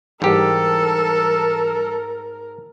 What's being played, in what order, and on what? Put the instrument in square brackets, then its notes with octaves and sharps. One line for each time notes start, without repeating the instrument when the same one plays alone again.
[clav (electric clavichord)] G#2 G4 [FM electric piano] E3 G3 [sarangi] A4 [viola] A#4